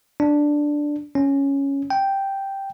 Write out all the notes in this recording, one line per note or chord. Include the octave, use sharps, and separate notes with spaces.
D4
C#4
G5